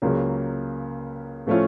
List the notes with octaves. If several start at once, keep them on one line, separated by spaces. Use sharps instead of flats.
C#2 C#3 F#3 A#3
A2 F3 A3 C#4 F4